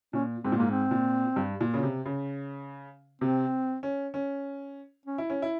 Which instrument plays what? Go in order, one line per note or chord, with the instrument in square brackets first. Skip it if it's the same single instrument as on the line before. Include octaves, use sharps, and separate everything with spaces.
[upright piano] A#2 [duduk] C#4
[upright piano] G#2 [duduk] C4
[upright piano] A#2
[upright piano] G#2 [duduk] A#3
[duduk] C4
[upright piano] A#2
G2
A#2
C#3
C3
C#3
[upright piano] C3 [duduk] C4
[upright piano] C#4
C#4
[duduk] C#4
[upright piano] E4
C#4
E4